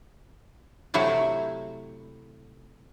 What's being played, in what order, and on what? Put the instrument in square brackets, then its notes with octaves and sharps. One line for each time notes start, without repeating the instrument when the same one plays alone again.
[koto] C3 F#3 A3 E4 G4